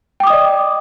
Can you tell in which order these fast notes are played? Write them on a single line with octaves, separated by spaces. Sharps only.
G5 D6 D#6 D#5 D5